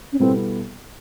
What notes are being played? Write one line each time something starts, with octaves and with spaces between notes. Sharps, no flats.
C#4
B2 G3 B3 C4 E4 A4